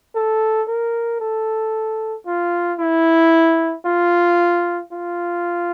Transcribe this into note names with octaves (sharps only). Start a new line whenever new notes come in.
A4
A#4
A4
F4
E4
F4
F4